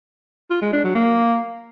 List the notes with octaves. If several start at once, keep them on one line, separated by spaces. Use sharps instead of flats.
F4
G#3
D4
F#3
A#3